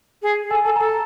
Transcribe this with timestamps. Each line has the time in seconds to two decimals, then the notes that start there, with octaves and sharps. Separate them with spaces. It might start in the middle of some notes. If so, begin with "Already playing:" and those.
0.22 G#4
0.44 G#4
0.51 A4 G#5
0.65 A4 A5
0.76 A#5
0.80 A4 A5
0.89 A#5